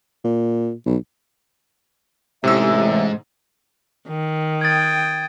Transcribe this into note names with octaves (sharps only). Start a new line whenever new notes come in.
A#2
B1
A1 G#2 C3 E5 E6
D#3
G5 D#6 G#6 A6